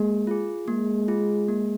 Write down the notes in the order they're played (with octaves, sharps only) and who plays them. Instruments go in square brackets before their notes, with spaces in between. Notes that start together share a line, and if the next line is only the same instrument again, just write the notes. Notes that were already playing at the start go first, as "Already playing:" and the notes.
Already playing: [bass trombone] G#3 [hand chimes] A#3
[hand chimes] F4 G#4
[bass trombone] G#3 [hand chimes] A#3
[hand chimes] F4 G#4
A#3